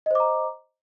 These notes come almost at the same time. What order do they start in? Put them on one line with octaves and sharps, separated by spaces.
D#5 C5 D6 A#5